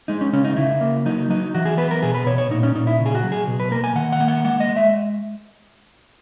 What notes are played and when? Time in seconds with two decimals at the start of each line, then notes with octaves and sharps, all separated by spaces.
0.08 G#3 D#4
0.21 C#4
0.33 C#3 C#4
0.44 D#4
0.57 C#3 E4
0.81 A#3
1.05 F#3 D#4
1.30 F#3 D#4
1.54 E3 F#4
1.65 G#4
1.77 B3 B4
1.91 A#4
2.02 B2 G#4
2.15 B4
2.26 B2 C#5
2.38 C#5
2.50 A#2 D#4
2.63 C#4
2.75 A#2 D#4
2.87 E4
2.99 C#3
3.06 G#4
3.15 F#4
3.23 F#3
3.32 G#4
3.47 B2
3.60 B4
3.71 A#3 A#4
3.84 G#5
3.95 D#3 F#5
4.12 F#5
4.20 A#3
4.28 F#5
4.44 G#3 F#5
4.60 D#5
4.69 G#3
4.76 E5